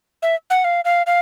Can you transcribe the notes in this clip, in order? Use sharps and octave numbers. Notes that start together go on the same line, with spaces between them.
E5
F#5
F5
F5
F5